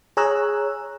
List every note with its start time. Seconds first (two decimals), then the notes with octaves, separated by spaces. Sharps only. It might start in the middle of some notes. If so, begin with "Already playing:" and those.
0.17 G#4 C#5 A#5 E6 F#6